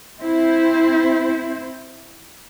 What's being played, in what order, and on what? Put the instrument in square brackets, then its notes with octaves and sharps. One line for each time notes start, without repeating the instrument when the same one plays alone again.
[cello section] C4 E4 C5